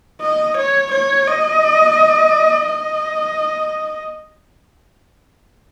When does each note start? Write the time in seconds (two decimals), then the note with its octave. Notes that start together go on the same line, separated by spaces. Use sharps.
0.21 D#5
0.57 C#5
0.92 C#5
1.27 D#5
2.66 D#5